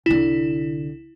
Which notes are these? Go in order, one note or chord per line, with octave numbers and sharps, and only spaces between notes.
C2 D3 E4